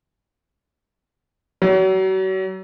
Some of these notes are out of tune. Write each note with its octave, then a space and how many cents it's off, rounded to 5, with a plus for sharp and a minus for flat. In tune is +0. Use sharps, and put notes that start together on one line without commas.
F#3 +40